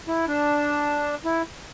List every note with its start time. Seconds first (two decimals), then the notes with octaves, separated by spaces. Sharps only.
0.08 E4
0.28 D4
1.25 E4